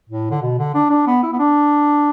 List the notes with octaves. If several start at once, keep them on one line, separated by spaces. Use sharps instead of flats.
A2
D3
B2
D3
D4
D4
B3
E4
B3
D4